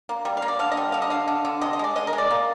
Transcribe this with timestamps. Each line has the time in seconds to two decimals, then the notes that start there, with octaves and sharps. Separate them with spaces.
0.09 A#3
0.25 G3
0.37 F5
0.42 A#3
0.48 D5
0.59 D3 F5
0.71 D#5
0.77 G3
0.92 D3 F5
1.02 D#5
1.10 D3 F5
1.28 D3
1.45 D3
1.61 C3 D#5
1.73 D#5
1.79 G#3 D5
1.96 G#3 D#5
2.07 A#4
2.13 G#3
2.18 D5
2.31 A#3